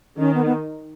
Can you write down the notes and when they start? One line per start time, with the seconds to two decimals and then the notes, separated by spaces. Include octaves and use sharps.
0.18 D#3 C#4
0.35 B3
0.46 B3